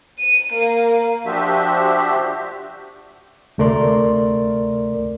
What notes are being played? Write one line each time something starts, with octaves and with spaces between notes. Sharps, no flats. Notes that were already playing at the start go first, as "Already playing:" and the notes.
D#7
A#3
F3 D4 F#4 G4 C5 E5
D2 C3 A3 A#4 D5 C6